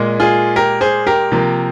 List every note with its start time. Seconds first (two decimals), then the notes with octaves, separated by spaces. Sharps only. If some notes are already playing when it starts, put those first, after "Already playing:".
Already playing: A#2 G#3
0.20 F4 G#4
0.56 G4 A#4
0.81 G#4 C5
1.07 G4 A#4
1.32 C3 F3 A#3